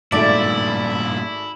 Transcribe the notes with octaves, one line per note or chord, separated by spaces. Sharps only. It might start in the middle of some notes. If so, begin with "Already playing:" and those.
G#1 G2 A#2 A3 E4 D5